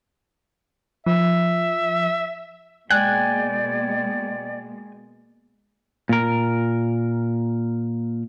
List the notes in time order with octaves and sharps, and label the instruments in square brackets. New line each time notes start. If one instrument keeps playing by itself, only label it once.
[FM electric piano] F3 [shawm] E5
[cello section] B2 G#3 A#3 [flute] D5 [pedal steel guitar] G5 G#5 [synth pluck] F#6
[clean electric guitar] A#2 A#4